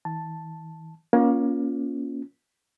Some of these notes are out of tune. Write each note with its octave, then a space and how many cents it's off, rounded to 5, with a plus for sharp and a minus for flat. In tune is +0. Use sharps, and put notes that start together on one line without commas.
E3 -40 A5 +0
A#3 +30 C#4 +15 F4 +0